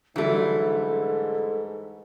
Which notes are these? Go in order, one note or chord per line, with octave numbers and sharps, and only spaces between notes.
G#2 D3 E3 F#3 G3 A3 A4